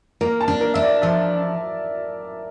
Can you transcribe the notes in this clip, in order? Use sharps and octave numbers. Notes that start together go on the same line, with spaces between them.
A#3 A#4
A5
D4
A#4
D4 E5
D5
F3 E5